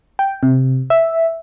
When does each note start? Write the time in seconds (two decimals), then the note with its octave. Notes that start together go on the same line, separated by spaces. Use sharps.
0.19 G5
0.43 C3
0.90 E5